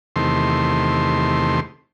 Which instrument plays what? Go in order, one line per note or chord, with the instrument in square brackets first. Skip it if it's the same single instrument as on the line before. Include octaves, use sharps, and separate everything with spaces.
[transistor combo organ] E2 C3 D#3 A3 C6